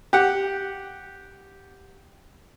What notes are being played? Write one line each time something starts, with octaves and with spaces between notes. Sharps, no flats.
G4 F#5